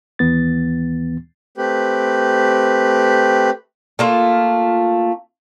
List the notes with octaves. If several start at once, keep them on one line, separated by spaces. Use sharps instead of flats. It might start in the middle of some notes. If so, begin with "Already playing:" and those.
D#2 E3 B3 A6
A3 C4 G4 B4
A3 A#3 F4